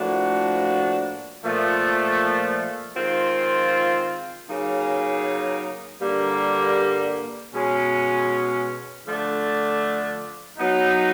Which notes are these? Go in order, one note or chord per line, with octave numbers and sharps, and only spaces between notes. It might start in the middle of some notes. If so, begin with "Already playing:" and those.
Already playing: A2 F3 A#3 D4 F#4
A#2 F3 A3
D#3 G#3 C4 F4
C#3 F#3 A#3 D#4 G#4
G2 D3 G3 A#3
B2 G#3 C#4
D3 F3 A3 D4
F#3 B3 D#4